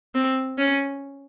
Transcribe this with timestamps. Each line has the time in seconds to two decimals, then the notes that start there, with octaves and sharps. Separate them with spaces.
0.14 C4
0.58 C#4